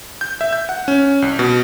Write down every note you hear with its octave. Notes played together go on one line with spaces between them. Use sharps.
G6
E5
G6
F#5
C#4
C2
B2